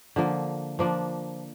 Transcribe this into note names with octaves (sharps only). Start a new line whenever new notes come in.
D3 F3 A#3
F3 A#3 D4